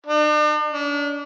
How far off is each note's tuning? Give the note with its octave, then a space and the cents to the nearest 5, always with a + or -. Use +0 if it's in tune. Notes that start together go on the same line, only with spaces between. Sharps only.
D4 +45
D4 -35